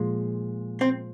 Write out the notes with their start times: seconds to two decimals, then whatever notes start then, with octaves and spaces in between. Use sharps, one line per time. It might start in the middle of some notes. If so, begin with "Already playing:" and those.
Already playing: A#2 F3 G#3
0.81 C4